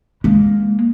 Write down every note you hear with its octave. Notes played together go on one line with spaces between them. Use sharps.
G#3 A#3